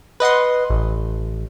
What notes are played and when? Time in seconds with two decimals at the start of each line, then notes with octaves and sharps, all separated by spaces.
0.20 B4 D#5 F#5 C6
0.70 A1